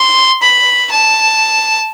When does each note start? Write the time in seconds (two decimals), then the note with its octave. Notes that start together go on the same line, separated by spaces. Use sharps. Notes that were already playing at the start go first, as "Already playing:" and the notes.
Already playing: C6
0.42 B5
0.91 A5